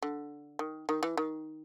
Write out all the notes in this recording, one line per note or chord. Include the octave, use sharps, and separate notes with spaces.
D3
D#3
D#3
E3
D#3